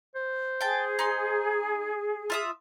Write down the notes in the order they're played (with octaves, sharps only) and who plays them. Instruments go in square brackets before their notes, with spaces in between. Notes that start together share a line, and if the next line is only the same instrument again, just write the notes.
[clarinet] C5
[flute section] G#4 [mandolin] G5 A5
[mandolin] D#4 C6
F4 E5 D#6